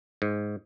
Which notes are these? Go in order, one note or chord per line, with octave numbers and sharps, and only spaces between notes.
G#2